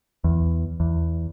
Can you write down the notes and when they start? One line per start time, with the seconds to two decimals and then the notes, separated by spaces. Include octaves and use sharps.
0.24 E2
0.80 E2